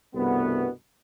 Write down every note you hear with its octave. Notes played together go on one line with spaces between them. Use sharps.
C2 G2 B2 G3 A3 B3